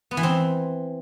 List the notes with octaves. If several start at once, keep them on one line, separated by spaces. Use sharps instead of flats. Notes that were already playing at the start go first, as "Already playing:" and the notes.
B3
E3
C4